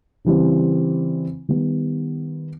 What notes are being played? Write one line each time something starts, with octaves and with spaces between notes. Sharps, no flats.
C#3 E3 G3 C4
D#3 G3 B3